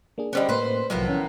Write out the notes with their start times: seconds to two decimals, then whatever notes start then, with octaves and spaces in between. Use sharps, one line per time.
0.18 A#3 D4 G#4
0.33 D3 G3 B3 C#4 C5 D#5
0.49 A2 A#3 B4 C5 C6
0.90 C2 A2 F3 F#3 A#3 B3
1.08 E3 C#4